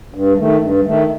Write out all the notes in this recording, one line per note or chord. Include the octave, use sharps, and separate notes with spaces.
G2
D#3 A3
G2
D#3 A3